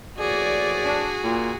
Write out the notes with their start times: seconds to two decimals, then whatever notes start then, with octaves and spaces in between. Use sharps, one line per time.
0.18 A#1 A2 F#4 G#4 D5
0.85 D4
1.24 A#2